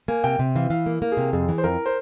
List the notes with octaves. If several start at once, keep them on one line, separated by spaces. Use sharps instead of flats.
A#3 G#5
C3 G5
C3
E3 F5
E3 F5
A#3
A#3
G#4
C3
F2 G#4
E3
C5
F2 A#4
C5